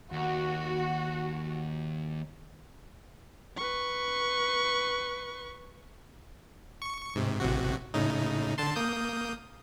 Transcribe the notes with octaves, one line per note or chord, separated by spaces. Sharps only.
D#2 F#4
B4 C#6
C#6
G#2 C3
A1 C3 F#4
A2 C#3 D#4
D3 A5 C6
A#3 D#6 G6